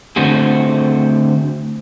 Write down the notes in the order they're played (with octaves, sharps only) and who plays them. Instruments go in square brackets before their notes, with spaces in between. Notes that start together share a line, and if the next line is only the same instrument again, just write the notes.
[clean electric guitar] D3 A3 C4 F4 F#4 G#4